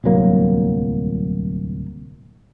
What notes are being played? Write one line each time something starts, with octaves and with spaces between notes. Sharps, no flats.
D1 C2 F#3 A#3